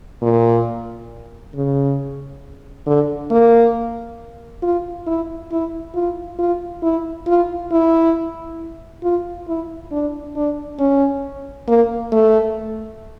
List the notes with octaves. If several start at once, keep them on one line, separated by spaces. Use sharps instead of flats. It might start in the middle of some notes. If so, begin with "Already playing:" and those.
A#2
C#3
D3
A#3
F4
E4
E4
F4
F4
E4
F4
E4
F4
E4
D4
D4
C#4
A#3
A3